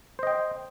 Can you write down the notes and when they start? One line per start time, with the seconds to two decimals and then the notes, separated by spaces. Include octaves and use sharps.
0.19 C5
0.23 D#5
0.27 G5